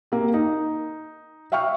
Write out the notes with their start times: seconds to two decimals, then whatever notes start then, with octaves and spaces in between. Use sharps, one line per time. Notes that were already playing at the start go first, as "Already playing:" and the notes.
0.12 A#3 G4
0.34 D#4
1.52 E5 F5 G5 C#6 F6